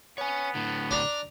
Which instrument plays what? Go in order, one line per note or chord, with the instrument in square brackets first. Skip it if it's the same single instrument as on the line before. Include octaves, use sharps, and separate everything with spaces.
[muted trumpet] B3 [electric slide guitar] C#5 G#5
[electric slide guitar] A2 D3
[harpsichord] D4 A#5